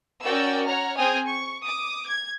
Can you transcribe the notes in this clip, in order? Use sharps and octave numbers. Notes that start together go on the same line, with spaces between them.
C#4 F#4 A#4 D5 G5 E6
C#5 F#5 A#5 F6
C4 G#4 G5 G#5 D#6 F6
C#6
D6 D#6
G#6